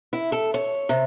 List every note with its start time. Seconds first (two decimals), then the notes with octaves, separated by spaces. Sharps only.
0.13 E4
0.32 A4
0.54 C#5
0.89 C3